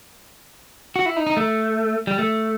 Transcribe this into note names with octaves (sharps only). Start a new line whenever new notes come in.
F#4
E4
D#4
D#4
A3
G3
A3